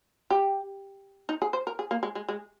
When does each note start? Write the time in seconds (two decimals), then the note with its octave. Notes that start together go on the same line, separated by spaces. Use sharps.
0.30 G4
1.29 D#4
1.42 G#4
1.53 C5
1.67 A#4
1.79 G#4
1.91 A#3
2.03 G#3
2.15 G#3
2.29 G#3